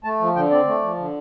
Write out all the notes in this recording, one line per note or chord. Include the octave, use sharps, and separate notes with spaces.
A3 A5
F3
D3 G5
C4 D5
A3
F3
D3